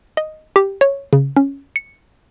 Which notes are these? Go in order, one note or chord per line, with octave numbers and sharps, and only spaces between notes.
D#5
G4
C#5
C#3
C#4
C#7